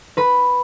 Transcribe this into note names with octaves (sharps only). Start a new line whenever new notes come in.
B4 B5